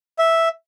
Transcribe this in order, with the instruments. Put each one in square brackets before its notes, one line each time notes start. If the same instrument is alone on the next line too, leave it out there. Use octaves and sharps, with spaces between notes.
[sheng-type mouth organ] E5